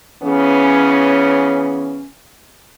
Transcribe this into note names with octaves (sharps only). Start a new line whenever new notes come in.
C#3 E3 B3 C#4